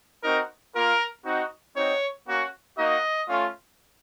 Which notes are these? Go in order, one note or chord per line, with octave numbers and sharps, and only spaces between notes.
C4 D#4 F#4 A#4
A#3 F4 A#4
C4 D#4 F#4
C4 D#4 F#4 C#5
A#3 C#4 F#4
A#3 D#4 F#4 D#5
A3 C#4 F4